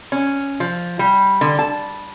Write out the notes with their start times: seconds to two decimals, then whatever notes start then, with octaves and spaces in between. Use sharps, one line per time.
0.12 C#4
0.60 F3
0.99 G3
1.41 D3
1.59 A5